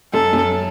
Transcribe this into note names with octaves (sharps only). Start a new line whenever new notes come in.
F#2 A4
F#2